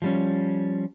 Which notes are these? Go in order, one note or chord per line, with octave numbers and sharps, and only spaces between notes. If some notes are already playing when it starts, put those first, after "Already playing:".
F3 G3 C#4